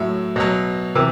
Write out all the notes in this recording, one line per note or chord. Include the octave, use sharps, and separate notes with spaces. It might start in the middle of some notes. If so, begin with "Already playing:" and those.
Already playing: A2 F#3 E5
B2 F#3
C3 E3